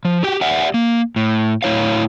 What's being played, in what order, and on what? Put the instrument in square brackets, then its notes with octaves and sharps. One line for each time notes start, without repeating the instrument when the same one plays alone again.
[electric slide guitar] F3
F#4 G4 G5
G4 D5 E5 F#5
A#3
A2
A2 E4 C#5 F5